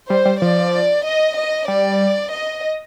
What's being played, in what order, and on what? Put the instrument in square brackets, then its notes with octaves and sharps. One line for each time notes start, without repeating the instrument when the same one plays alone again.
[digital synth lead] G3 [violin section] C5
[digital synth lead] G3
[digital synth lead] F3 [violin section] D5
[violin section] D#5
D#5
[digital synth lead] G3 [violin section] D5
[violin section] D#5